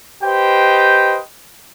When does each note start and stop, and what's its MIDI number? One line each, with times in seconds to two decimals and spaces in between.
0.24 1.19 67
0.24 1.19 71
0.24 1.19 72
0.24 1.19 75
0.24 1.19 79